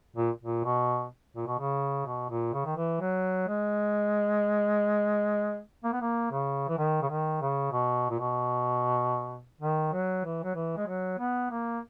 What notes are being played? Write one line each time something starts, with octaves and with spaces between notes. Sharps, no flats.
A#2
A#2
B2
A#2
B2
C#3
B2
A#2
C#3
D#3
E3
F#3
G#3
A#3
B3
A#3
C#3
E3
D#3
C#3
D#3
C#3
B2
A#2
B2
D#3
F#3
E3
F#3
E3
G#3
F#3
B3
A#3